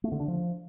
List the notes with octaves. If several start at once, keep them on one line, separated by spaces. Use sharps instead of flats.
A3
D3
D4
F3